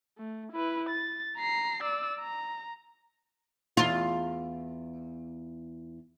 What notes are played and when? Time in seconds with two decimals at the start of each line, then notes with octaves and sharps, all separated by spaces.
0.18 A3
0.52 E4 B4
0.89 A6
1.37 A#5 C7
1.83 D5 E6
2.20 A#5
3.77 E2 F4